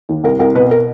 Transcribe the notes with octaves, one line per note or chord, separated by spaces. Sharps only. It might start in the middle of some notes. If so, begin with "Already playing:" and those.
D#2
C2 A#4
C2 A#4
B2 B4
A#4